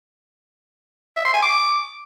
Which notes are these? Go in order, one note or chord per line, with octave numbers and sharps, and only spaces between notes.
E5
C6
G#5
D6